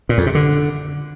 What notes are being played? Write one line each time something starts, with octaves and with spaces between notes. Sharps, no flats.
A#2
F2
C3
D3